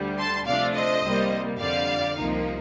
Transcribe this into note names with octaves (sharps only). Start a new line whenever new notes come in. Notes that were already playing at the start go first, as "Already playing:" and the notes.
Already playing: D2 D3 G3
A5 C6
C3 F3 A3 D4 D5 F5
C5 D#5
C2 C3 G3 A#3
F2 D3 G3 D5 F5
C2 C3 F3 A#3 D#4